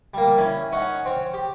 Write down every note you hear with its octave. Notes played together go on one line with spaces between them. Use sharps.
G3 A#3
C#4 E4
C#4 D#4 C#5 F#5
C4 C#5
G4